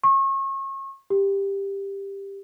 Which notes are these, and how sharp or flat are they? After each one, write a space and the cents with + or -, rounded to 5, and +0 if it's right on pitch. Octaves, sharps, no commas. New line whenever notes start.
C#6 -35
G4 +10